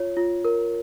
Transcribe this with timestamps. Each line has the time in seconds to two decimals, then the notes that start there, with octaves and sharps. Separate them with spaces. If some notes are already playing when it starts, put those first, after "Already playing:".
Already playing: F4 C#5
0.17 F4
0.45 A#4